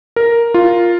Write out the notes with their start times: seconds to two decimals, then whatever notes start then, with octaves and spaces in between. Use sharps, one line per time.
0.16 A#4
0.54 F4